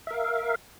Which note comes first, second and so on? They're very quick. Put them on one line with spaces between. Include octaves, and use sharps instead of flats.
E5 A#4 F5